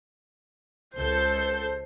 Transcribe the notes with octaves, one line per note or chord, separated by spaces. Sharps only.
C#2 A4 C5 G6